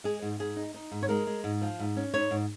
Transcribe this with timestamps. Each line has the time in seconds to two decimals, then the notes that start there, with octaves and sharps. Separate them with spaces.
0.04 G#3 G#4
0.22 G#2
0.39 G#2 G#4
0.56 D#4
0.74 D#4
0.92 G#2
1.02 C#5
1.09 G#3 A#4
1.27 G#3
1.44 G#2
1.61 F3
1.79 G#2
1.96 C#4
2.14 G#2 C#5
2.31 G#2